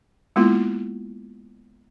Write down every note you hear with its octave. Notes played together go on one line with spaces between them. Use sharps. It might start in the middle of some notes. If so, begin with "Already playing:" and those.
G#3 A#3 B3 E4 F4